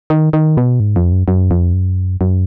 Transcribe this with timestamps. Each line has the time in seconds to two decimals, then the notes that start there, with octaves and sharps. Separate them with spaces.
0.10 D#3
0.33 D#3
0.57 B2
0.80 G#2
0.96 F2
1.12 F#2
1.28 F#2
1.51 F2
1.73 F#2
2.21 F#2